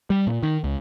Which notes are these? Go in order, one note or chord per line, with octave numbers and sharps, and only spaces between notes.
G3
A#2
D#3
C#2